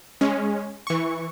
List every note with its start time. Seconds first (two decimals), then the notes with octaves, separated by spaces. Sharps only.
0.21 G#3 C#4
0.87 E3 C#6